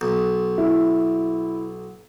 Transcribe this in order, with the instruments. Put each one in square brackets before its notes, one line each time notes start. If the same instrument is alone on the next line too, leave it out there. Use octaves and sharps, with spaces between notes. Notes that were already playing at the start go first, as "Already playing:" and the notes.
[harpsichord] B1
[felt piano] E4